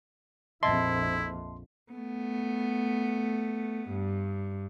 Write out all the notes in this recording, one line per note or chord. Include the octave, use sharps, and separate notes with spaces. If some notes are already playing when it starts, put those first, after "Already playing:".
A#1 F2 E4 D#5 E5 A5 C6
A3 B3
G2